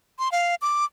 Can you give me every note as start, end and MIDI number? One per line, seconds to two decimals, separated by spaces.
0.19 0.31 84
0.32 0.55 77
0.62 0.85 86